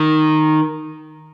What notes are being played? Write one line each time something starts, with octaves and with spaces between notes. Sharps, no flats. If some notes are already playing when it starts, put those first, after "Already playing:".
Already playing: D#3